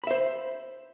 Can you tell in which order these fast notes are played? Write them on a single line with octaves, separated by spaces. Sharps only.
B5 E5 C5